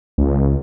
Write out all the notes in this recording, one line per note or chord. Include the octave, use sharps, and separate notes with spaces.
C#2